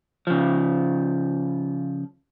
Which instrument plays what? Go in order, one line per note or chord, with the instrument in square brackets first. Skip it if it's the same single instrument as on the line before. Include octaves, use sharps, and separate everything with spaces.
[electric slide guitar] C#3 F3